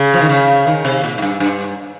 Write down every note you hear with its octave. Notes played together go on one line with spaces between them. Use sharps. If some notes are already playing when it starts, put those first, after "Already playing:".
Already playing: C#3
F3
D#3
C#3
D#3
C3
A#2
G#2
G2
G2